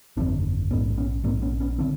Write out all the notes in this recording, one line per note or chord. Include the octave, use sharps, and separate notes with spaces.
G1 F2 D3 C4 D4
A#1 G#2 B3 C#4
B3 C#4
A#1 G#2 A#3 C4
B3 C#4
B3 C#4
D3 C4 D4